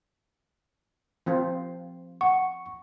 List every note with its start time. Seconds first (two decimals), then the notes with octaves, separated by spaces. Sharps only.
1.26 F3 C4 F4
2.21 F#5 C#6